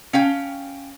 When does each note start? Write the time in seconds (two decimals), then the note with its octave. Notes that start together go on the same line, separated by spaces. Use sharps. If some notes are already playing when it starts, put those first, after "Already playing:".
0.13 C#4 F5 G5